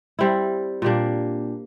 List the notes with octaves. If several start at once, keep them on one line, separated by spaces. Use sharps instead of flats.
G3 C4 E4
A#2 G3 A#3 D4